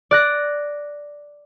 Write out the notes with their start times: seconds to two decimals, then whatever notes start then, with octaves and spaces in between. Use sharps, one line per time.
0.11 D5 F#6 A#6